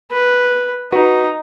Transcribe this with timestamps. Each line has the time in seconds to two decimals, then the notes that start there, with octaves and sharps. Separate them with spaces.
0.11 B4
0.92 D#4 F#4 B4